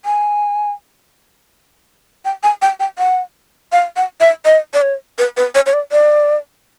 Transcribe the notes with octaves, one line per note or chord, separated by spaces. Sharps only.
G#5
G5
G#5
G5
G5
F#5
F5
F#5
E5
D#5
D5
C#5
B4
B4
C#5
C#5
D5
D5